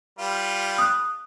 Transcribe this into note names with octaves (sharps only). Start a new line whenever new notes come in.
G3 F4 B4
D#6 F#6